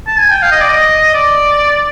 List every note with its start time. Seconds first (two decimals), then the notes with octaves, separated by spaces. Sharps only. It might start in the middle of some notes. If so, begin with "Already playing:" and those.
0.07 A5
0.19 G#5
0.31 G5
0.42 F5
0.51 D#5
0.61 D5
0.69 D#5
1.14 D5